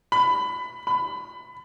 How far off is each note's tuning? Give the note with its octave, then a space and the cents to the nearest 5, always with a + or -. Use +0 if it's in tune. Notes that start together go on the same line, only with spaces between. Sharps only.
B5 +20
B5 +25